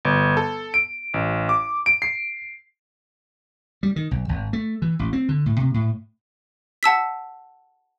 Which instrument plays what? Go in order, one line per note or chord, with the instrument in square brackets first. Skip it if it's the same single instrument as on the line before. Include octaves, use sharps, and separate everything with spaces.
[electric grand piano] G1
A4
D7
A1
D6
D7
C7
[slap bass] G3
D#3
B1
G#1
A3
E3
A1
C4
D3
A2
C3
A2
[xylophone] F#5 A5 E6 B6